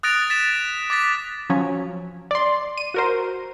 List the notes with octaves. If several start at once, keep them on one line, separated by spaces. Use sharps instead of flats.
D#6 F#6 A6 A#6 D7 F7
A6 B6 E7
D6 A6 B6
F3 F#3 C#4
D5 C6
D#7
F#4 A#4 C5